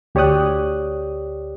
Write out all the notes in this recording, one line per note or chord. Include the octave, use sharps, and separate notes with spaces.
D2 G4 C#5 D5 D#6 F#6